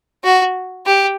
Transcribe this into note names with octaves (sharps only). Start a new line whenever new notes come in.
F#4
G4